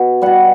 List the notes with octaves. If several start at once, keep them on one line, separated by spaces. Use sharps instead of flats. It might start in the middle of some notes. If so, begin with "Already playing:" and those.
Already playing: B2
B2 G3 F#5